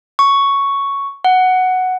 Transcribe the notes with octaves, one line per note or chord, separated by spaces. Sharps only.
C#6
F#5